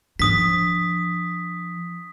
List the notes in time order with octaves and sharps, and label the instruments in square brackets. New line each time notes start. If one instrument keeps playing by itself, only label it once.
[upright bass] F3 D4 [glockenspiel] D#6 B6